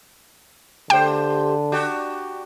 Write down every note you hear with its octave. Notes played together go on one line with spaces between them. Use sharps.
D3 A3 G4 C5 G5
D4 F#4 G4